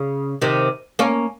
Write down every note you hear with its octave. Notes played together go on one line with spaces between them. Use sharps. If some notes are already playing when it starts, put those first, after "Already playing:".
Already playing: C#3
C3 D#3
A#3 C#4